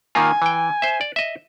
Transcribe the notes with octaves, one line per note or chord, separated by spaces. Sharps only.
D#3 A#3 F4 G#5
E3 G5
C5 E5
D5
D#5 E5